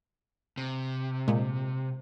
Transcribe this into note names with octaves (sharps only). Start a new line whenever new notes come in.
C3
A#2 G#3